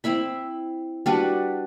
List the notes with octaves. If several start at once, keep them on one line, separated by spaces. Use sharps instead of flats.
C4 E4 E5 B5
G3 D4 F#4 B4